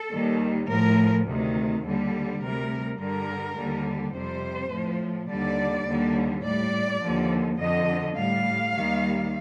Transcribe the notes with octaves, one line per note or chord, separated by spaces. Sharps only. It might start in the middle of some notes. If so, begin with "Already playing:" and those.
Already playing: A4
D#2 D#3 G3
A2 F3 A#4
D2 C3 D#3
D#2 D3 G3
D2 C3 G3 A#4
G2 D3 G3 A#4
D#2 D3 G3
F2 C3 G3 C5
A2 F3
D#2 D3 G3 D5
D#2 D3 G3
A2 G3 D5
D#2 D3 F3
F2 D3 F3 D#5
A2 G3 F5
D#2 D#3 G3